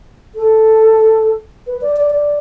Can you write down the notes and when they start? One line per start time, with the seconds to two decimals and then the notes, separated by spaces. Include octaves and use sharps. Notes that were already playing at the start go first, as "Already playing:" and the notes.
0.35 A4
1.67 B4
1.81 D5
1.96 D5
2.11 D5